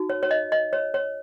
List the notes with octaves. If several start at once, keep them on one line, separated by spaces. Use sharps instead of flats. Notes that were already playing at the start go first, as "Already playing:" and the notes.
Already playing: D#4 F#4
C#5
C#5
D#5
D#5
C#5
C#5